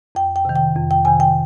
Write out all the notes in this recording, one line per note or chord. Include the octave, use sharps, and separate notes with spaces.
F2 G5
G5
C3 D#3
G5
F2
G5
C3 D#3 G#5
G5